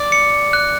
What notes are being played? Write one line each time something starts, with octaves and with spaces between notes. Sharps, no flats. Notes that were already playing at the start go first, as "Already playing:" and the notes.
Already playing: D5
C#7
F#6